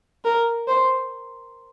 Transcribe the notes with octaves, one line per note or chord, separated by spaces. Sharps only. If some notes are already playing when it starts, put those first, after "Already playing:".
A#4
C5